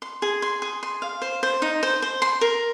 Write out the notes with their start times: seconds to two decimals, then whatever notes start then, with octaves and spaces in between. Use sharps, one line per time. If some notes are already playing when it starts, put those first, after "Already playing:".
0.02 C6
0.22 G#4
0.42 C6
0.62 G#4
0.83 C6
1.02 F5
1.22 C5
1.43 C5
1.62 D#4
1.83 C5
2.02 C5
2.22 C6
2.41 A#4